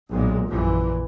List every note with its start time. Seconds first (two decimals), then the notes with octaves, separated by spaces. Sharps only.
0.11 B1 A#2 G#3
0.47 A#1 F#2 A#2 E3